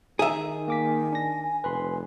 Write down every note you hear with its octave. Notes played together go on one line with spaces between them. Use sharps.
D#3 D#4 G#4 E5
A#3 G#5 D6 B6
D4 A#6
F1 B4 B5 C6